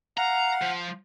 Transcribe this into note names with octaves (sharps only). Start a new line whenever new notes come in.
F5 F#5 A#5
F3